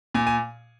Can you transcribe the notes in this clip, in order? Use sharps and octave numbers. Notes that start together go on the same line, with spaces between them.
A#2 G#5
G#5